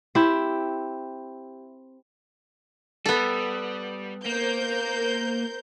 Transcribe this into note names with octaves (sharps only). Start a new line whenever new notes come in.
C4 E4 G4
G3 B3 A4
A#3 A#4 C5 G6